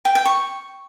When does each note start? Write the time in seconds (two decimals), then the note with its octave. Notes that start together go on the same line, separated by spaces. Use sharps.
0.05 G5
0.15 G5
0.25 C#6